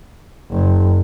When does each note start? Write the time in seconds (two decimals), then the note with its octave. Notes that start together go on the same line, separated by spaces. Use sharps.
0.50 F#1